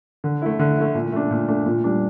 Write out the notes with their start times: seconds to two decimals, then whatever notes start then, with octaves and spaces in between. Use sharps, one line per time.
0.24 D3
0.42 A3 E4
0.59 D3
0.77 A3 E4
0.95 A#2
1.12 A3 D4
1.31 A#2
1.48 A3 D4
1.66 A#2
1.84 G3 D4